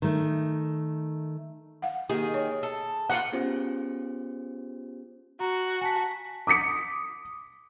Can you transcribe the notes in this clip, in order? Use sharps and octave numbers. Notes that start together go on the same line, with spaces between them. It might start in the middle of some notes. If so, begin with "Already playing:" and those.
D#3 A3
F5 F#5
D#3 A#3 G4 G#4
C#5
A4
A#3 D4 F4 F#5 G5
B3 C#4 F4 G4 G#4 C5
F#4 A#5
G#5 A5 B6
D6 D#6 B6 C#7